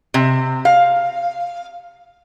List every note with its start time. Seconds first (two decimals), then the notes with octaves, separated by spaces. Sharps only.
0.14 C3
0.65 F5